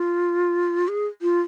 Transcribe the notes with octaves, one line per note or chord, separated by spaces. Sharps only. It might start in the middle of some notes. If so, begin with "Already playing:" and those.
Already playing: F4
G#4
F4